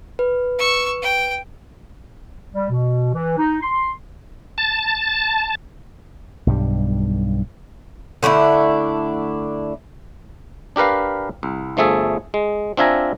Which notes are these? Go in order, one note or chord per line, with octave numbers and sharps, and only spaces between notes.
B4
C#6 E6
G5
G3
B2
E3
D#4
C6
A5
B1 G2 G3
D3 A3 D4 E4
D4 G4 A#4 B4 F5
C2
G1 F3 A3 G#4 E5 A5
G#3
C4 D4 F4 E5 G#5 A#5